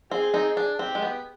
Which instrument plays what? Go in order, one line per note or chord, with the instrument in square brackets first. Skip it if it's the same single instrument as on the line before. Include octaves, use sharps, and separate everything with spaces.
[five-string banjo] C4 [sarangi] G#4
[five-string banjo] C4 D#4
D4
[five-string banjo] C4 [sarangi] G4
[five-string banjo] G#3
B3